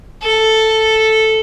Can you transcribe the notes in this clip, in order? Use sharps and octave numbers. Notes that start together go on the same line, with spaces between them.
A4